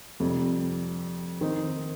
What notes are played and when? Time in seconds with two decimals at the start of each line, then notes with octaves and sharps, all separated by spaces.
0.20 F2 C3 G3
1.41 D#3 C4 D#4